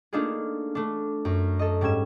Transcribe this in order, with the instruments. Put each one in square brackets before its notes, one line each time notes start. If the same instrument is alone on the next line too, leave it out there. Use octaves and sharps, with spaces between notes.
[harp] A3 A#3 D4 D#4 F4 G#4
A3 D4
F#2
A4 D#5
G#2 G3 C#4 G#6 E7